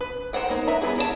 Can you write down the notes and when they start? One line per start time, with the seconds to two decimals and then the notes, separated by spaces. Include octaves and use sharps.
0.01 B4
0.33 A#4 C5 C#5 F#5 G5
0.49 A#3 B3 D#4 C#5
0.67 B4 E5 A#5
0.82 G3 B3 C#4 E4 G#4
0.98 A#4 C#5 D5 A5